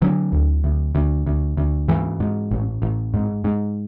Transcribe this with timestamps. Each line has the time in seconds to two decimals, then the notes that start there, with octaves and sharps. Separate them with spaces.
0.02 D3 F#3
0.32 D2
0.64 D2
0.95 D2
1.26 D2
1.57 D2
1.88 G#2 E3
2.20 G#2
2.51 A1
2.82 A1
3.14 G#2
3.44 G#2